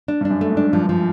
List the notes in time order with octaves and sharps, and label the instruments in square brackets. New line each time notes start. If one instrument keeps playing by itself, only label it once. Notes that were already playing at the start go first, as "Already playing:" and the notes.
[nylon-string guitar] D4
[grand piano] G2 [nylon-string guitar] D4
[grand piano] F#2
[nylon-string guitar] A3
[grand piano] G#2
[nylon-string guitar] D4
[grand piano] G2 [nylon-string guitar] F3
[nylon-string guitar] F3